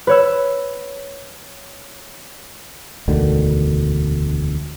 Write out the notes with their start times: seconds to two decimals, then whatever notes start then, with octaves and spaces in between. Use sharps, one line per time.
0.07 B4 C#5 E6
3.08 E1 D2 D3 D#3